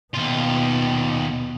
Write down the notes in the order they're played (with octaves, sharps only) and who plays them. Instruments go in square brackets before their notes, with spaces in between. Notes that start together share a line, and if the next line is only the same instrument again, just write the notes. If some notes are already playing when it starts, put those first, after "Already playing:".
[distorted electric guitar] D#2 F4 [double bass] B2